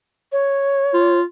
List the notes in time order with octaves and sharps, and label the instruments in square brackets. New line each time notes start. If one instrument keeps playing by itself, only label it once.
[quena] C#5
[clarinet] F4